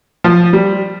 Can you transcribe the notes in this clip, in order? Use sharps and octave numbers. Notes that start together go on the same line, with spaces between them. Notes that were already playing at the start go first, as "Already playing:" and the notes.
F3
G3